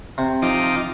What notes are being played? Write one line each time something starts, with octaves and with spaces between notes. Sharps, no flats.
C3
F3 D#4 D6